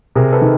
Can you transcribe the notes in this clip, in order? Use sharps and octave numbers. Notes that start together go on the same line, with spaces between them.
C3 G#4 A#4
A4 B4
D#3